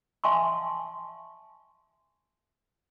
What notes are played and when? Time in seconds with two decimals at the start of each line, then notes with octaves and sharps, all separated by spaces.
0.24 E5 F5 G#5 A5 C6 C#6